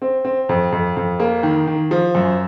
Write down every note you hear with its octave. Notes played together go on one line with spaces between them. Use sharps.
C4
C4
F2
F2
F2
A#3
D#3
D#3
F3
F#2